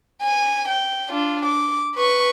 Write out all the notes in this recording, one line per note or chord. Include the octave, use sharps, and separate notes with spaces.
G#5
G5
D4 F4
D6
B4 C#6